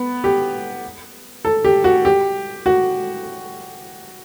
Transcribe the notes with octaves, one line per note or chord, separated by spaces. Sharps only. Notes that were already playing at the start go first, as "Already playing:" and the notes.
Already playing: B3
G4
A4
G4
F#4
G4
F#4